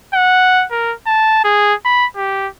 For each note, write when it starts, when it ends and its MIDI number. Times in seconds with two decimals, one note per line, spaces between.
0.14 0.65 78
0.71 0.94 70
1.06 1.40 81
1.44 1.74 68
1.85 2.06 83
2.16 2.48 67